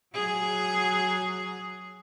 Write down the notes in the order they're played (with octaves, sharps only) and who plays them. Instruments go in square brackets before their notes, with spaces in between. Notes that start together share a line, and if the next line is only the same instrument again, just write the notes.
[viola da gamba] F#3 G#4